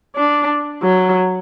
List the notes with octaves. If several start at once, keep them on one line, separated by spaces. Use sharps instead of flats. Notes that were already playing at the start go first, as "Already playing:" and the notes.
D4
F#3